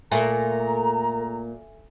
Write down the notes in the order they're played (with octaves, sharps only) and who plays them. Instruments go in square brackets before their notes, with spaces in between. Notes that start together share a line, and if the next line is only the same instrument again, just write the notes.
[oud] A#2 A3 [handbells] A4 E5 G#5 [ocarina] A#4 [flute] A#5